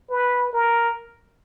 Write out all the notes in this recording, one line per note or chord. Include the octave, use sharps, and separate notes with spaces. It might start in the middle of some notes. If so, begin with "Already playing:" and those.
B4
A#4